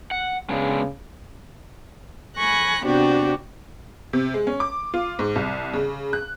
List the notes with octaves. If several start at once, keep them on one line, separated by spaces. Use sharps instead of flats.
F#5
C#3 G#3 B3 D4
G#5 B5 C#6 F#6 A#6
C3 B3 C4 D4 F#4 G4
C3
G#3
C#4
D6
F4
G#2
C2
C#3
F#6